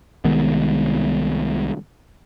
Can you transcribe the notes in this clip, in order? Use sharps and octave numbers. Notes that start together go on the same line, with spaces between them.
C2 D#3 G#3 B3